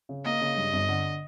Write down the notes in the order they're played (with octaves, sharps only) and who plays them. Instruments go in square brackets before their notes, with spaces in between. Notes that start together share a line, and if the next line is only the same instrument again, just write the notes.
[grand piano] C#3
[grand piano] A#3 [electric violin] D#5
[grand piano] C#3
G2
G1
D3